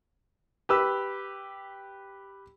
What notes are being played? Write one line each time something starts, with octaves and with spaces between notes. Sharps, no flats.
G4 B4 E6